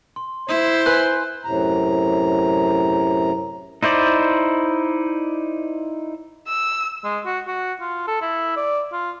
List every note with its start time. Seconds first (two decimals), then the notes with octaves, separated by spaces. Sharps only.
0.16 C6
0.48 E4 C5
0.86 B4 G#5 F#6
1.45 F#2 A2 C3 A#5
3.83 D#4 E4 C5 D5
6.48 E6
7.04 G#3
7.26 F#4
7.47 F#4
7.81 F4
8.08 A4
8.21 E4
8.56 D5
8.92 F4